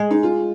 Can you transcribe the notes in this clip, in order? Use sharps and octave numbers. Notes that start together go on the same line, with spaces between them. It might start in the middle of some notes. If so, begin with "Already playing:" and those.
Already playing: G#3
D#4
F4